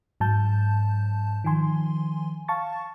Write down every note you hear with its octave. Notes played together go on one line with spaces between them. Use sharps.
G#2 F#3 A5 G6
D#3 F3 G#5 C6
F5 A5 C#6 A6